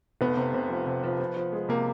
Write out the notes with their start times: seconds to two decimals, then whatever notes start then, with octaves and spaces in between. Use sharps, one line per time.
0.21 F1 B3
0.37 C3
0.54 C3
0.70 F3
0.87 C3
1.03 F3
1.20 F3
1.36 F3
1.53 G#3
1.69 C3 A#3